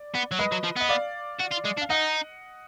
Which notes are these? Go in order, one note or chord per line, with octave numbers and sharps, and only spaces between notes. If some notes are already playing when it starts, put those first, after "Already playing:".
Already playing: D5
B3
F#3
G#3 B4 D#5
F#3
F3
B3 D#5
D5 F5
F#4
F4
G#3
D4
F5
D#4 D#5 F#5